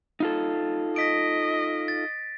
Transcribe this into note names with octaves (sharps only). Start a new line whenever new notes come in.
D#4 F4 A4
D#5 A#6 B6 D7
A6